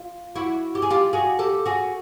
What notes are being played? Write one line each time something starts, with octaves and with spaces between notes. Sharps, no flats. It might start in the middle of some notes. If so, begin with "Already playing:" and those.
Already playing: F4
E4 F#4
G4
G#4
F4 G4
F#4 G#4
G4 A4
F#4 G#4